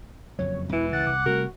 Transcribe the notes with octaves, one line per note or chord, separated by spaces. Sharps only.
F#1 F2 F#3 C#5
E2 B2 E3 G#3 E4
C#2 F#5 A6
C2 D6
C3 G3 A3 F#4 A#4